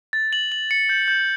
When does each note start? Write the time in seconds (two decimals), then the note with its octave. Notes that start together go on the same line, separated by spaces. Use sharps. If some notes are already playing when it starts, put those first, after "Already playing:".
0.13 A6
0.33 F#7
0.52 F#7
0.71 C#7
0.89 G6
1.08 G6